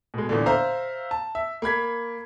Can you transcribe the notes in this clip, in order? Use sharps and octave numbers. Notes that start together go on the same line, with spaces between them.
B2 G#3
E2 A#2 D3
C5 E5 F5 A#5
A5
E5
A#3 B5 G#6 B6